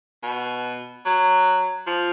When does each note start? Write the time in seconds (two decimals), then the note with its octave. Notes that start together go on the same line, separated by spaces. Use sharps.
0.23 B2
1.05 F#3
1.87 F3